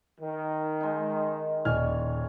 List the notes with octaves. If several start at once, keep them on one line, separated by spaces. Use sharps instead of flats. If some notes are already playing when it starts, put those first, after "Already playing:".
D#3
G#3 D#4
D#1 C#5 D5 G#5 F6